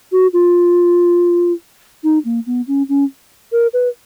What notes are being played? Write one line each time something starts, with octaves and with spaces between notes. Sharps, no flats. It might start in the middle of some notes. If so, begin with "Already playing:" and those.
F#4
F4
D#4
A#3
B3
C#4
C#4
A#4
B4